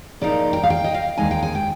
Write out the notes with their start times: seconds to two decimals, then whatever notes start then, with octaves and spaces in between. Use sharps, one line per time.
0.21 G#2 F3 A#3 D#4 D5
0.53 G5
0.63 F5
0.70 G5
0.84 D#5
0.94 F5
1.18 D#2 D#3 G#3 D#4 G#5
1.31 G5
1.42 G#5
1.55 G5